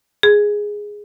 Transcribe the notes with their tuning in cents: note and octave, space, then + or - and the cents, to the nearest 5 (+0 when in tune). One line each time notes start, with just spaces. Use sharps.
G#4 -5